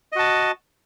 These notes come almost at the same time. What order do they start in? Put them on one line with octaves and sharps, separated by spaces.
D#5 F#4 A5